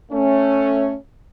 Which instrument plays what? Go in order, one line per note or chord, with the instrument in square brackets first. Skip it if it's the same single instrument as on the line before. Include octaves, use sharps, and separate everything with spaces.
[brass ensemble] A3 C#4